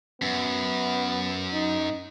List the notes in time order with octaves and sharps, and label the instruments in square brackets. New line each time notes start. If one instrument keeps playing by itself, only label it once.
[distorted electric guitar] F#2 [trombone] B3
[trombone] D#4